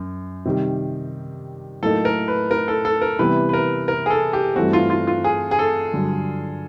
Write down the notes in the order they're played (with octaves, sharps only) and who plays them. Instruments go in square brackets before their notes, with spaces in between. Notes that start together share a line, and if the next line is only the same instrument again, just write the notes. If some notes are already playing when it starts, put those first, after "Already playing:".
Already playing: [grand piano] F#2
C3 D#3 G3
[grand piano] A2 F#3 A#3 D#4 [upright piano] A4
[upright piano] A#4
B4
A#4
A4
A4
A#4
[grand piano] C3 E3 G3 B3 E4 [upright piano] B4
[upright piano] B4
A#4
A#4
G#4
A4
G4
[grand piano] G2 E3 A3 C4 [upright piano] F#4
[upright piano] F4
F4
F4
G#4
G#4
A4
[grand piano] G2 D3 F#3